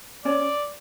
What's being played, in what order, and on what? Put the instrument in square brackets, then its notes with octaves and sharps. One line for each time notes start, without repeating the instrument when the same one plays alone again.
[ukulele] C#4 [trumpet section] D5